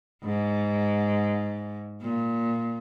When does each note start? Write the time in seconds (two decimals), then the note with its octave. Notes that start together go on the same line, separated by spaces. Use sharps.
0.23 G#2
2.01 A#2